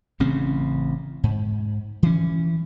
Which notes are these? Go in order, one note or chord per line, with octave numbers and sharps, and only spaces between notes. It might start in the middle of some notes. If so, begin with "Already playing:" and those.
A1 C#3 C4 C#4
G#2
E3 C#4